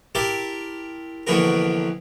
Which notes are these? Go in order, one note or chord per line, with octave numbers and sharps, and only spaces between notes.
E4 G4 A#4 A5 C6 D6
A#1 D3 E3 B3 F#4 A#4